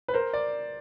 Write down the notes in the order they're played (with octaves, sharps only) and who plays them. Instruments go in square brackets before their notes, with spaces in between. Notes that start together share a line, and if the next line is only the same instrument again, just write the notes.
[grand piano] B4
A#4 C5
D5